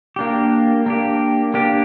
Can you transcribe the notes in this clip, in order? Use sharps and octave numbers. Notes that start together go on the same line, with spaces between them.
A#3 D4 G4
A#3 D4 G4
A#3 D4 G4